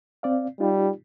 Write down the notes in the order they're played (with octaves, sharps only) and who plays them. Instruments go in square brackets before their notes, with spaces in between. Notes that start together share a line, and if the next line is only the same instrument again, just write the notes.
[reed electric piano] C4 D5 F5
[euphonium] G3 [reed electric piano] D#4 F4 G4